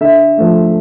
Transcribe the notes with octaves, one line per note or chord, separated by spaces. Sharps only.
D3 E5
F3 A3